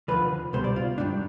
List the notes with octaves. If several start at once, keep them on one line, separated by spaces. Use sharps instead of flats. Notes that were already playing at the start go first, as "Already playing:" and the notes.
D#2 D3 F3 B4
C2 B2 G3 C5
D5
F4
G2 D#3 G3 D4